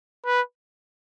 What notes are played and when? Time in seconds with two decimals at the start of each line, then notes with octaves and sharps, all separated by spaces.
0.26 B4